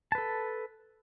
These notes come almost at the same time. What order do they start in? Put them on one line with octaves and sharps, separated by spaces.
A5 B4 A4